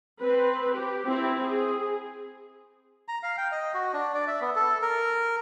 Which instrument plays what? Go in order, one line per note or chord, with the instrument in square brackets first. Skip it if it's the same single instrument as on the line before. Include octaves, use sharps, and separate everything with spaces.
[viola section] C4 B4
G4
C4 E4
G#4
[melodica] A#5
F5
G5
D#5
F#4
D4
D5
E5
B3
A4
A#4